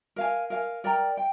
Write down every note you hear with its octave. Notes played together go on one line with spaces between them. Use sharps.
A#4 F5 G#5
A#4 F5 G#5
A#4 D5 G5 A#5
G5